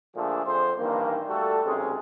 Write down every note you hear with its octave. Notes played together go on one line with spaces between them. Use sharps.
A#2 D3 F3 A3 D4 G#4
F2 C5
G2 D#3 E3 A#3
G3 A3 F#4 A4
B1 C3 G#3 C#4 G#4